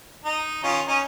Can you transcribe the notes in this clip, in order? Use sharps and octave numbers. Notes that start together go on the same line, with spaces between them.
D#4
D#3 C#4 F4
C#4 D#4